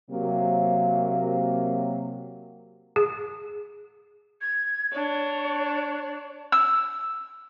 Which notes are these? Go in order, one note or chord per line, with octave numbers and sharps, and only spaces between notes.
C3 F#3 A#3
G#4
G#6
D4 C#5
E6